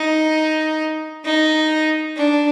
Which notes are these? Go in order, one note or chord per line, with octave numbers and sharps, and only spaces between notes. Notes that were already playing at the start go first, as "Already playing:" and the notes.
Already playing: D#4
D#4
D4